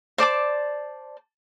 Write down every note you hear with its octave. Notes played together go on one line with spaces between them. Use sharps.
C5 D5 A5 D6